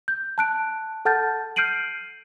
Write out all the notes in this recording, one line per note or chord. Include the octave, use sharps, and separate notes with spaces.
G6
A5 F#6 D7
A4 F#5 A5 F6 G6 A6
F6 G6 C7 D7 D#7 F#7